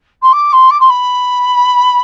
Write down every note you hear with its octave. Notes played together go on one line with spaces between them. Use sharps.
C6
D6
C6
D6
C6
B5